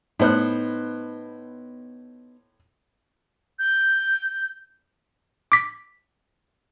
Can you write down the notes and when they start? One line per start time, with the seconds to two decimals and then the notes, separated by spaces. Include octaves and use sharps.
0.19 A2 B3 D#4 C5 F#6
3.59 G6
5.52 D6 B6